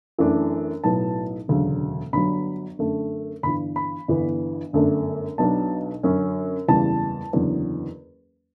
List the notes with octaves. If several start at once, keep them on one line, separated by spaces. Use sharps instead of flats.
F#2 E3 A3 D4
B1 A2 F#3 B3 A5
E1 D2 C#3 F#3
G1 G2 F#3 B5
F#2 D3 A3
G1 G2 E3 B5
B5
G1 G2 E3 B3
G1 F#2 D3 A3 D4
B1 B2 F#3 B3 D4 A5
F#2 D3 F#3 C#4
F#1 E2 C#3 E3 G3 A5
F#1 E2 D3 F#3